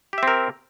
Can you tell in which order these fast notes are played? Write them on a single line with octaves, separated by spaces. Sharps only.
G4 E5 C4 A#4